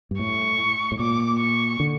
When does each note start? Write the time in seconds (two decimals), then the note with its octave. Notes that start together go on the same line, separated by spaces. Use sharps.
0.11 G2
0.19 A2 C#6
0.92 A2
0.99 A#2 D6
1.40 C#6
1.80 D3